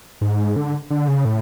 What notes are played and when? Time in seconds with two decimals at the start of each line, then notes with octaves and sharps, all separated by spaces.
0.21 G#2
0.56 D3
0.90 D3
1.08 C#3
1.25 A2